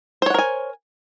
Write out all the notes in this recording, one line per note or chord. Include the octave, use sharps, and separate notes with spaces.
A#4 C5 C#5 F#5 G#5